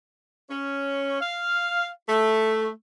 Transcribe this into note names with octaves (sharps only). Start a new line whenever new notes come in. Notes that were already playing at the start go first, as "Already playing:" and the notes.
C#4
F5
A3